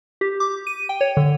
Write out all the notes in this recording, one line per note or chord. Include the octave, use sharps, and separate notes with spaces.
G4
D6
D#7
G5
C#5
D3